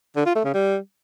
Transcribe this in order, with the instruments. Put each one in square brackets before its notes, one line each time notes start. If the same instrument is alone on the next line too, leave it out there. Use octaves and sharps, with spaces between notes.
[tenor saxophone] D3
F4
A3
C#3
G3